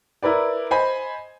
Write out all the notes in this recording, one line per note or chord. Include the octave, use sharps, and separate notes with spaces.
E4 A#4 B4 D5
C5 D#5 G#5 B5